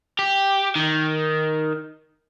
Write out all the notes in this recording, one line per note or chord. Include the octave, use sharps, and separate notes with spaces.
G4
D#3